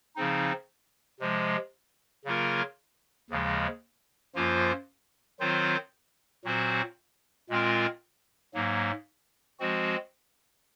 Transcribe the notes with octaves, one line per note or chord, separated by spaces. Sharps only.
C#3 F3 C4 D#4
C3 F3 G#3
C#3 F#3 A#3 F4 A#4
D#2 C#3 F3 G#3
F#2 F3 A#3 F4 C5
D#3 F#3 C4 F4 C5
A#2 F#3 C4 F#4 C5
A#2 G#3 C4 F4 A#4
G#2 F#3 A#3
F3 G#3 C4 F#4